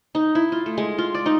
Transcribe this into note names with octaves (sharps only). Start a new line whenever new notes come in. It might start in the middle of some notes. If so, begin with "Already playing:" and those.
D#4
E4
F4
A3
G#3
F4
D5
D#4